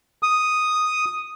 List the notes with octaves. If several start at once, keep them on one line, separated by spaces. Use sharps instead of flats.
D#6